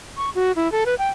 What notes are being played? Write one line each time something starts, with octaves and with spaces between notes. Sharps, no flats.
C#6
F#4
E4
A4
B4
G5